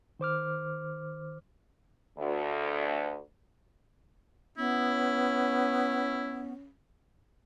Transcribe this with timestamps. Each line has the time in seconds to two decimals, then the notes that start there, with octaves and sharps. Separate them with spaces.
0.19 D#3 C5 D6 F6
2.17 D2
4.58 B3 C#4 E4